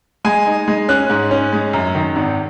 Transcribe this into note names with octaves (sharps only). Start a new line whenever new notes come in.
G#3 G#5
D#4
G#3
C#4 F#6
G#2
C#4
G#3
F#2
D#3
G#1